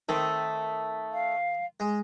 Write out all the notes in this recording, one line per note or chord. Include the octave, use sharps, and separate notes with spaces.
D#3 A3 C4
F5
G#3